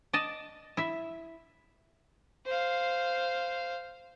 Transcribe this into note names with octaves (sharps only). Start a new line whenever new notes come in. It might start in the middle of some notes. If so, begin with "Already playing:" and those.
D5 D#5 A5
E4 E5
C5 F5